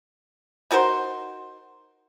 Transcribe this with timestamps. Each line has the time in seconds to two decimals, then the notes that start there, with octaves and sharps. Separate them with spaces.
0.71 D#4 F#4 A#4 C5